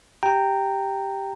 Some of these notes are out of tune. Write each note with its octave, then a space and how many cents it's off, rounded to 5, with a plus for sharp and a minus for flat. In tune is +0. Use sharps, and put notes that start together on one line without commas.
G4 +0 G5 +0 A#5 -15